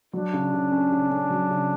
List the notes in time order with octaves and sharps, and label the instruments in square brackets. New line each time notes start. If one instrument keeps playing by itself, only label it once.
[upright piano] F#3 [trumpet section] D4
[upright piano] C#3
C#3
C#4
C#3
C#4
F#3
C#3